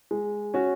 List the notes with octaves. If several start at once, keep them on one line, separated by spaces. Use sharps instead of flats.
G#3
C#4 F#4